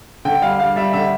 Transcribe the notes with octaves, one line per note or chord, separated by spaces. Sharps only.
D3 G5
G3 F5
G3 F5
G3 E5
D3 E5